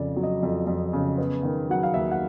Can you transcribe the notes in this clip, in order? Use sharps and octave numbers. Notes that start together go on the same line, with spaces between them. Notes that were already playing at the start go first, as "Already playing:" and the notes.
Already playing: F2 C#3 D5
F#3
D#5
F2
F2
C#3
B3
D#3
F#3 F#5
F5
D#2 E5
F#5